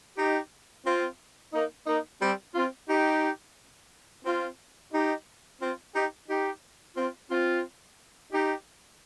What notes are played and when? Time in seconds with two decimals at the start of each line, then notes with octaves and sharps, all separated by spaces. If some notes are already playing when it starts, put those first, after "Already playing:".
0.18 D#4 G4
0.85 C4 F4
1.54 A#3 D#4
1.87 A#3 D#4
2.21 G3 C4
2.55 C4 F4
2.89 D#4 G4
4.25 C4 F4
4.93 D#4 G4
5.61 C4 F4
5.95 D#4 G4
6.28 D#4 G4
6.96 C4 F4
7.30 C4 F4
8.32 D#4 G4